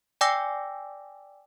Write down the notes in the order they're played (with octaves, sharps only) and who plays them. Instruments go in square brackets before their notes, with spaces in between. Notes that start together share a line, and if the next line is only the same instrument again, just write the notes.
[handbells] D5 G5 G#5 D6 E6 A#6